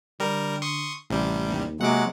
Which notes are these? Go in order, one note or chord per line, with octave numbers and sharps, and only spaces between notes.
D3 G3 A#4
C6 C#6 D#6
A1 C3 G3 A3
D#2
C3 F#3 G#3 A#3 F#5 D6